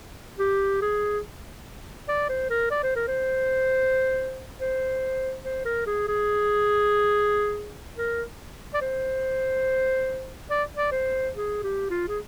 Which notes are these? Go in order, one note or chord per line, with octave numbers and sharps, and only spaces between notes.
G4
G#4
D5
C5
A#4
D5
C5
A#4
C5
C5
C5
A#4
G#4
G#4
A#4
D5
C5
D5
D5
C5
G#4
G4
F4
G#4